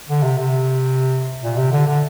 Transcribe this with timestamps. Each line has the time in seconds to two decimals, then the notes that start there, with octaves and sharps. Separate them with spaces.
0.09 D3
0.23 C3
0.38 C3
1.43 A#2
1.57 C3
1.72 D3
1.87 D3